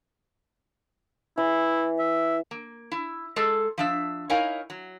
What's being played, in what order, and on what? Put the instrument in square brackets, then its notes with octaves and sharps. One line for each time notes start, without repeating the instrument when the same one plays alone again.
[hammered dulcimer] E3 [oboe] E4
[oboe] E5
[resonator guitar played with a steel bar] A#3
E4
G#3 G#4 A4
F3 D4 E5
D#4 E4 A#4 C#5 F5 G#5
F#3